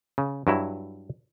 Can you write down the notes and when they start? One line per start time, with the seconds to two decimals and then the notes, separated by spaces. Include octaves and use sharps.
0.18 C#3
0.47 G2 F#3 E4